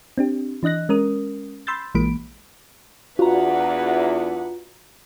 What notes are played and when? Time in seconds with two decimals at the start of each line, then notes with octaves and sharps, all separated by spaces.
0.18 C4 D4 G4
0.63 E3 D4 D#5 F#6 A#6
0.89 G#3 C#4 A#4 D#6
1.67 B5 C6 E6 G6 A6
1.95 A#1 E3 G#3 A#3 B5 D7
3.19 E2 D4 F4 F#4 B4 F#5 A#5